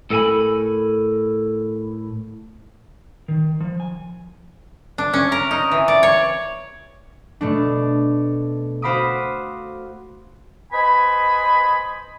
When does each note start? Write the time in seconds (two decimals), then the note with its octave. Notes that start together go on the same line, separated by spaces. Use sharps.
0.10 A2 A4 A#4 F5 G#5 B5
3.28 D#3
3.60 F3
3.80 G#5
4.98 D4
5.13 C#4
5.32 A#4
5.51 D#4
5.71 E3
5.88 D5
6.03 C#5
7.41 B2 A3 D4
8.82 F#4 C5 F5 B5 D6 D#6
10.73 B4 C5 D#5 G#5 B5